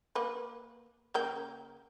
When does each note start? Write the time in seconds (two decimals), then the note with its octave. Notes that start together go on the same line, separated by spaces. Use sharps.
0.15 A#3 B4
1.14 C#3 A#3 G5